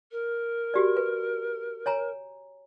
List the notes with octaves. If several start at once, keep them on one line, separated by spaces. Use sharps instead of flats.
A#4
F#4 G4 D5
B4
C#5 G#5 A#5